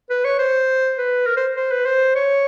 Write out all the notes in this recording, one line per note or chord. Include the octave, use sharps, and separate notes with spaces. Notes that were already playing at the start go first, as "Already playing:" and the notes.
B4
C#5
C5
B4
A#4
C5
C5
B4
C5
C#5